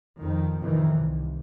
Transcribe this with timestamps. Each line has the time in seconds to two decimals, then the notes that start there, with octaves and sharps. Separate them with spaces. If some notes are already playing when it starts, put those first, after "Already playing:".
0.20 F2 D#3
0.60 F2 A2 C3 D#3 E3
0.97 C2